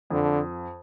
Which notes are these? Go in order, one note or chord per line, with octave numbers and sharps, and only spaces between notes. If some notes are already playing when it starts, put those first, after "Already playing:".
F2 D3